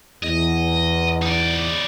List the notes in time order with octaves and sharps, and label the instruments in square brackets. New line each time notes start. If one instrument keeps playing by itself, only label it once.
[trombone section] E2 [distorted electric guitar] D#5
[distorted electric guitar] D#4 D5